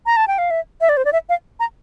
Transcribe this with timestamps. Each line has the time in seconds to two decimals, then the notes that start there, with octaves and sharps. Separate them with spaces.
0.06 A#5
0.17 A5
0.28 G5
0.38 F5
0.51 E5
0.81 E5
0.89 D5
0.97 C5
1.05 D5
1.13 E5
1.29 F5
1.60 A#5